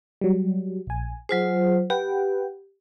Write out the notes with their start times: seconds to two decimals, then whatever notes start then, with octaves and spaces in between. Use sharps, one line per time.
0.21 F#3 G3
0.87 A#1 G#5
1.29 F#3 F4 G#4 C5
1.90 G4 B4 F#5 G5